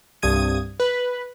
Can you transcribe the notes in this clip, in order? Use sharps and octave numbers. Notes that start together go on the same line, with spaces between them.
C2 G2 D#6 G#6 D#7
B4